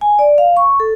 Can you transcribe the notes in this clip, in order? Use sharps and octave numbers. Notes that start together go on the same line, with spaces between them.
G#5
D5
F5
C#6
A4